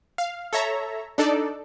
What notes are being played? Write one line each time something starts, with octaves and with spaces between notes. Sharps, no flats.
F5
A4 C#5 E5 A#5
D4 D#4 A4 D5